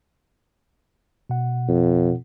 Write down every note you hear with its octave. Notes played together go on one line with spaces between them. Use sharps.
B2 F#5
F2